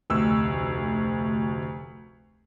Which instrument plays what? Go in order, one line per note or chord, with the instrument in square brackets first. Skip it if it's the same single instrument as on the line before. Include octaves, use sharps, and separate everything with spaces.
[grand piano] F1 D2 E6